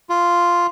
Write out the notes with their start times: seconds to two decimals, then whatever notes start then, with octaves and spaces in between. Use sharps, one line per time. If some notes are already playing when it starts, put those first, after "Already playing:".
0.10 F4